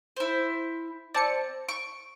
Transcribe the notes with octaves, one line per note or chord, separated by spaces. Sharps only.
E4 C5
C4 D5 A5 C#7
C#6 D7